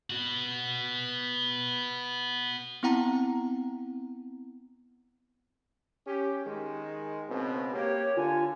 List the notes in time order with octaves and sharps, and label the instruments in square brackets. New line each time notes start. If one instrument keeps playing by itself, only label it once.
[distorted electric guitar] B3 F#4
[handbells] B3 C4 E4 F#5 G5 A#5
[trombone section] C#4 G4
D#3 G#3
C#2 B2 C4
[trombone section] A#3 G4 [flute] C#5
[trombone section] D3 [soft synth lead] F4 [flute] G#5